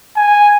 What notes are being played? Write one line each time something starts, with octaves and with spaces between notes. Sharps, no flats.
G#5